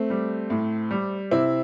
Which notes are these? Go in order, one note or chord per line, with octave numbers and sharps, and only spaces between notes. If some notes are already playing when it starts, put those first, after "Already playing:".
Already playing: A3 C4
G3
A2
G3
C3 C4 E4